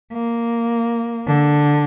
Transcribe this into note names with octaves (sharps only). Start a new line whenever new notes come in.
A#3
D3